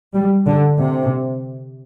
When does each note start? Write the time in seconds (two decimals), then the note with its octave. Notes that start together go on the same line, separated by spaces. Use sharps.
0.14 G3
0.47 D3
0.79 C3